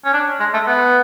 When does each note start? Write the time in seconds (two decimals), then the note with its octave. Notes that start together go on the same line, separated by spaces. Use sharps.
0.05 C#4
0.13 D4
0.39 G#3
0.53 A3
0.66 B3